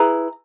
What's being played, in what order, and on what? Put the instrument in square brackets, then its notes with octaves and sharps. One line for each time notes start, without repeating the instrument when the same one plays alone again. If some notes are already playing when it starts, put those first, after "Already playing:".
Already playing: [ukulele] E4 G#4 B4 A#5